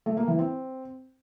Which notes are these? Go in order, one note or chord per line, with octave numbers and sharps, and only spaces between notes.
A3
A#3
E3
C4